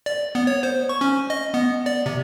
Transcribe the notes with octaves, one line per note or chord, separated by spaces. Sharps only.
D5
B3
C#5
C5
C#6
C#4
D#5
B3
D5
C3